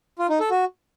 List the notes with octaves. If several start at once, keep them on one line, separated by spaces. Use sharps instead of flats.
F4
D#4
A4
F#4